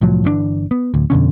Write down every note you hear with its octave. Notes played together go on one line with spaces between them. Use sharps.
C2 A2 F3 F#3
G1 E3 C4 D4
B3
D1 D2
F2 B2 D3 C#4